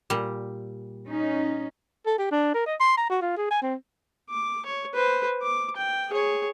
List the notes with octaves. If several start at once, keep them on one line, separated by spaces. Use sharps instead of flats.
A#2 G3
C#4 D#4
A4
G4
D4
A#4
D#5
C6
A#5
F#4
F4
G#4
G#5
C4
D6
C#5
B4 C5
D6
G5
G#4 C#5